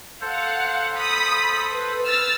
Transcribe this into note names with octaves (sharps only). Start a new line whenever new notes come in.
A4 C5 F5 F#5
B5 D#6 B6
B4
E6 F6 A6